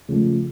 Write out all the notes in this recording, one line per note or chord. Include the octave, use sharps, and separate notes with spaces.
C#3 F3 A3